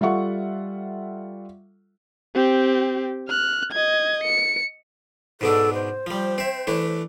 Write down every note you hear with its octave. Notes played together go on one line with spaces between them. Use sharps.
G3 F4 A4 E5 F#5 C#6
C4 G4
F6 F#6
D#5 G#6
C#7
G#2 B2 D4 A4
C5
F3 G3
C4 E5
E3 A3 D4